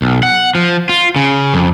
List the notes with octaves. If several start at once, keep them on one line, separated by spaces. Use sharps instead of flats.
B1
F#5
F3
F4
C#3
F2